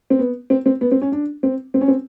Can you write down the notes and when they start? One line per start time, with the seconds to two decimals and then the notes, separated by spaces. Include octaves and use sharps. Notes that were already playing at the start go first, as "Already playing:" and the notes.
0.10 C4
0.19 B3
0.50 C4
0.66 C4
0.81 B3
0.92 C4
1.02 C#4
1.12 D4
1.43 C4
1.74 C4
1.81 C#4
1.88 C4